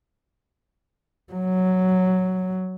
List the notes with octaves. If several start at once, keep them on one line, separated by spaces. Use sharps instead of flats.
F#3